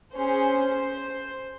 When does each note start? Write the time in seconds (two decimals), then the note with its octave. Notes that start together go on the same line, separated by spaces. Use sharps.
0.15 C#4 G#4 C5
0.76 C5